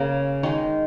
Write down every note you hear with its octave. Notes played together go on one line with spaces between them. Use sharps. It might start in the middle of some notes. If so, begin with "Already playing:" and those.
Already playing: C#3 A#3 A#4
D#3 G#3 D#4